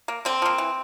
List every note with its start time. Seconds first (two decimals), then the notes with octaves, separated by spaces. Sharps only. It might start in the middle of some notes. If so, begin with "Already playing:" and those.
0.08 A#3
0.25 D3 C4
0.42 F3 A#3
0.58 E3